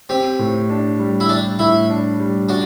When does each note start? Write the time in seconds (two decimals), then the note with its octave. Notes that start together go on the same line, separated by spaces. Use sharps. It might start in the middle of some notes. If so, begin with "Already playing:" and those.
0.09 C4 G4
0.39 A2
0.70 D4
0.99 G3
1.20 E4
1.29 D4 G4
1.59 A2 E4
1.90 D4
2.20 G3
2.49 D4 F#4